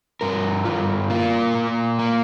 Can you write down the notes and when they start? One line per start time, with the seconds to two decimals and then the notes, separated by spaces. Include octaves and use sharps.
0.21 G2 A#4
0.65 G2 F4
1.10 A#3 F4
1.55 A#2
1.99 A#3